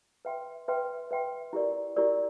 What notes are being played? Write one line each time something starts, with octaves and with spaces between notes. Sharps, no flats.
B4 E5 G5 C6
B4 E5 G5 C6
B4 E5 G5 C6
E4 G4 A#4 D5
E4 G4 A#4 D5